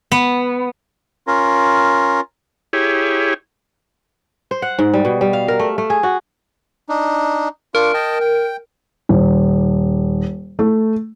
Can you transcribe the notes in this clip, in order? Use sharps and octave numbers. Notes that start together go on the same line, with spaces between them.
B3
C#4 F4 A#4
E4 G4 G#4 C#5
C5
F#5
G#2
G3
B2
G3
F5
A#4
A3
A3
G#4
F#4
D4 D#4
D4 F4 A#4 C#6
D#5 G5 A5
G5
D#1
A3